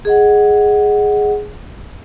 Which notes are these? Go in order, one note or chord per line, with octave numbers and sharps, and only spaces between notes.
G#4 D#5 F#5